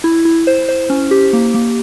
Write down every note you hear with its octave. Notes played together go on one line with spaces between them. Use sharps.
E4
E4
C5
C5
C#4
G4
A#3
A#3